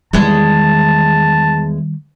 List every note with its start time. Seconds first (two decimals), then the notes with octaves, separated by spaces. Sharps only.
0.13 E2 D#3 G3 G#3 A5